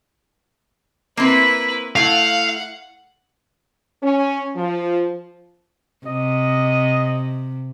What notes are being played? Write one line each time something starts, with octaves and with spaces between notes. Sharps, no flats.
A#3 C4 E4 B4
A3 E4 F5 F#5
C#4
F3
C3 D#5